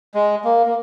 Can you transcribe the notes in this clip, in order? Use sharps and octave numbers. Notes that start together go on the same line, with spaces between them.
G#3
A#3
A#3